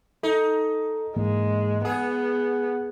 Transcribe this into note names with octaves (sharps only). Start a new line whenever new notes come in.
D#4 A4
G#2 E3 G#3 A#3
B3 G#4 F#5